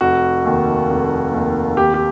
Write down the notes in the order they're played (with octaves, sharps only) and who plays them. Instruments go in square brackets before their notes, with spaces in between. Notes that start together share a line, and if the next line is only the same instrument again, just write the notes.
[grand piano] F1 F#4
D#2 D#3
F1
D#2 D#3
D#2 G4
G4